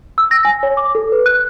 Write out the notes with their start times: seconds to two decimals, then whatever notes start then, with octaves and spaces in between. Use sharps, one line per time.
0.18 E6
0.31 A#6
0.45 G#5
0.63 C#5
0.77 D6
0.95 A4
1.12 B4
1.26 F#6